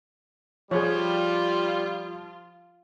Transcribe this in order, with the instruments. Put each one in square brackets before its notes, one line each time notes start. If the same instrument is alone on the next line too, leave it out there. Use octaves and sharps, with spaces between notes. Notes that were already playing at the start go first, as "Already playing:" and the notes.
[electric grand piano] F3 [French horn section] G3 [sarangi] F4 [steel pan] G#4 C#5